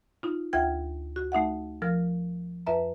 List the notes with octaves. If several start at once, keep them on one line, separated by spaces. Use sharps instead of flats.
D#4 F4
D2 F4 E5 G5 G#6
F#4
A3 D#4 E5 F#5
F3 A#4 F6
F2 B4 E5 A#5